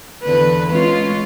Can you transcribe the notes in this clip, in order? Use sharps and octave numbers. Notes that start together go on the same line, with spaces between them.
E2 D3 B4
G#3 C#4 F4